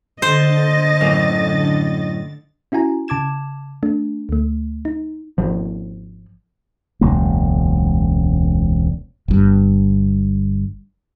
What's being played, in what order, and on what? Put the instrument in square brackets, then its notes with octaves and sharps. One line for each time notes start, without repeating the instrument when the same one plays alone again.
[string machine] D3 A6 [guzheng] C5 [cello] D#5
[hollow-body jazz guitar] F#2 A2 A#3
[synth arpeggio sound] C#4 E4 F#4 G#5 A#5
C#3 A5 D6 G#6 E7
A3 D4
D2 A3
D#4
[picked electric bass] G#1 F3
[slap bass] E1 C#2 F#2 A#3
[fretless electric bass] G1 G2